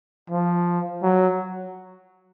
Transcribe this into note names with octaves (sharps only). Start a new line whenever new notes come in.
F3
F#3